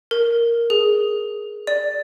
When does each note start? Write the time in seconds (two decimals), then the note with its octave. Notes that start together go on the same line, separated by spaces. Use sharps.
0.11 A#4
0.70 G#4
1.67 D5